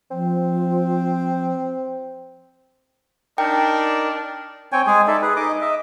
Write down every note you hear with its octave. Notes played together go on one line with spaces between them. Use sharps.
F3 C4
D4 D#4 A#4 G5
C4 C#5 G5 G#5
G#3 G#4 G#5
D#4 A4 D5 E5
G#4 B4
D#4 D#5 D6
D#5 E5